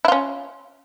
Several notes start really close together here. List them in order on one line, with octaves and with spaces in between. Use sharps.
E4 F4 C#4